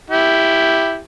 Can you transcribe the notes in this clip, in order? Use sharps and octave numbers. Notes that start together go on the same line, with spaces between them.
E4 G4